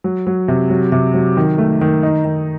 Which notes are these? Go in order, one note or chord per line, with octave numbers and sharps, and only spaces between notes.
F#3
F#3
C3
F#3
C3
F#3
D#3
A3
D#3
D#4
D#3